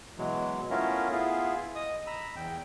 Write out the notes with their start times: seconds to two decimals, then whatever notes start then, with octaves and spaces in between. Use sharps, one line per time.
0.18 B2 E3 F#3 G#3
0.70 A3 B3 C#4 E4 F4 A#4
1.12 B3 E4 F4 G#4
1.76 D#5 D#6
2.07 A#5 B5 E6
2.36 E2 G5